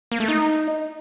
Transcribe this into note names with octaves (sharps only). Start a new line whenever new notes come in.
A#3
A3
D#4